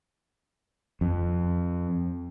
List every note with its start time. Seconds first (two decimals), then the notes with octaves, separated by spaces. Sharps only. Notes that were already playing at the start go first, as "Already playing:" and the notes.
1.01 F2